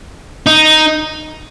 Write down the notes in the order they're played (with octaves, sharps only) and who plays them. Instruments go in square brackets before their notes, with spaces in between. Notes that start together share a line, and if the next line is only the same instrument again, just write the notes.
[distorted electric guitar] D#4